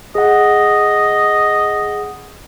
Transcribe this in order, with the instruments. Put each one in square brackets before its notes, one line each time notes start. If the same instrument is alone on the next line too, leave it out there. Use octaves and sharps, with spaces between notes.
[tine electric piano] G#4 F#5 [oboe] D#5